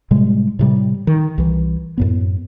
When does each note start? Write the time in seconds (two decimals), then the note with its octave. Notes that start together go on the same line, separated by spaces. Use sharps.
0.11 A2 C3 G3 G#3
0.59 A2 C3 G3
1.07 D#3
1.38 C2 E3
1.98 F#2 A2 B3